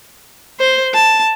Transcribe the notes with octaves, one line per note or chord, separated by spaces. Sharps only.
C5
A5